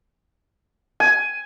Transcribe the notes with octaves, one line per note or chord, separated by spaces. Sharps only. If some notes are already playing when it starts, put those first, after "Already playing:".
G#5